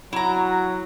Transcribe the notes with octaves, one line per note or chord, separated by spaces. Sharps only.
F#3 E4 A#5